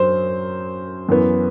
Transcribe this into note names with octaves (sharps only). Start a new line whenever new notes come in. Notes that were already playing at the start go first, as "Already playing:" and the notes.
Already playing: F#2 F#3 C5
F#2 E3 B3